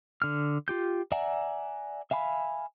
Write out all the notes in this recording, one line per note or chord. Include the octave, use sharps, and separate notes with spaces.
D3 F6
F4 G4 G6
D5 E5 F#5 G#5 A#5
E5 F5 G#5 B5